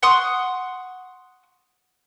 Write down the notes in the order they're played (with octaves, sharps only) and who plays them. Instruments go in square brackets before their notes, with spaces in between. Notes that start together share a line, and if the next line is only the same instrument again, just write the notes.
[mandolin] F#5 C6 C#6 D#6